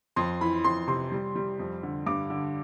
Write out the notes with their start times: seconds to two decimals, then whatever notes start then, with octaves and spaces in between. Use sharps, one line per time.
0.16 F2 C6
0.41 E3 B5
0.64 F2 C6
0.87 C3 C6
1.12 G3
1.36 G3
1.59 F2
1.83 D3
2.06 G2 D6
2.30 D3